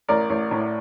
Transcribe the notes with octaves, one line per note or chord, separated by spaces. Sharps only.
A1 A#4 D5
A1
A2